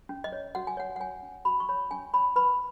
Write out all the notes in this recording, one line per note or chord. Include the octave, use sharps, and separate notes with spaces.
C#4
D#5
C#5
F#4 F#5
G#5
C#5 F#5
F#5
C#5 G#5
C#4
F#4 B5
C#6
C#5 B5
C#4 G#5
C#5 B5
B4 B5